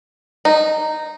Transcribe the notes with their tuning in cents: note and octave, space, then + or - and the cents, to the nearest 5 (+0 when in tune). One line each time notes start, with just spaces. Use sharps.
D#4 -10